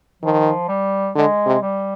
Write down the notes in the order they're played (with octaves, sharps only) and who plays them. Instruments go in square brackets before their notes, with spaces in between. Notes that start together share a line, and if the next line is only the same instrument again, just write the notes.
[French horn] D#3 [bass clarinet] F3
[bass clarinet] G3
[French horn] D3 [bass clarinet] G#3
[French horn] C3
[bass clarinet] G3